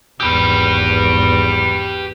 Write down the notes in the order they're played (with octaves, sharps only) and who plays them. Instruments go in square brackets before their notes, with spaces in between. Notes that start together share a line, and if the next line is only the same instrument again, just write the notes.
[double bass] G#1 E2 [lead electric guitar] G4 B4